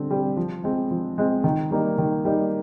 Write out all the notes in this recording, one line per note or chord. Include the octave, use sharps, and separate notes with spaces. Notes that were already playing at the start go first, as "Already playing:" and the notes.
Already playing: D3 G3 C4
G3 C4
F3
G#3 C4
F3
G#3 C4
D#3
G3 A#3 D#4
D#3
G3 A#3 D#4